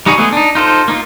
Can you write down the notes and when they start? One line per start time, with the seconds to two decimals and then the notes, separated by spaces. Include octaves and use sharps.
0.06 G3 D#4 F#4 G#4
0.18 G#3 A3 B3 G#4
0.32 D4 D#4
0.55 D#4 F4 A4 C5
0.88 A#3 D#4 F4